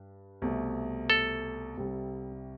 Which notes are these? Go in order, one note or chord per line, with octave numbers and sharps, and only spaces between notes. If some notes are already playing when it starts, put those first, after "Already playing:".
Already playing: G2
C2 B2 A3
A4
C2 C3 G3